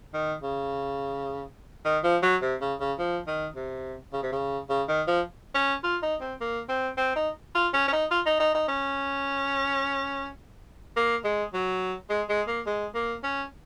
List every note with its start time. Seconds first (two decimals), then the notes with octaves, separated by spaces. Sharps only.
0.14 D#3
0.43 C#3
1.85 D#3
2.04 F3
2.23 F#3
2.42 C3
2.61 C#3
2.80 C#3
2.99 F3
3.27 D#3
3.56 C3
4.13 C#3
4.23 C3
4.32 C#3
4.70 C#3
4.89 D#3
5.08 F3
5.55 C#4
5.84 F4
6.03 D#4
6.21 C4
6.41 A#3
6.69 C4
6.97 C4
7.16 D#4
7.55 F4
7.74 C#4
7.88 C#4
7.93 D#4
8.11 F4
8.26 D#4
8.40 D#4
8.55 D#4
8.68 C#4
10.96 A#3
11.25 G#3
11.54 F#3
12.10 G#3
12.29 G#3
12.48 A#3
12.67 G#3
12.95 A#3
13.24 C#4